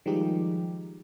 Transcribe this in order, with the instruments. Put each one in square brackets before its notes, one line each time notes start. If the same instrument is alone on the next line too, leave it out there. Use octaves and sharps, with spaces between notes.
[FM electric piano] D#3 F3 G3 G#3 D#4 G4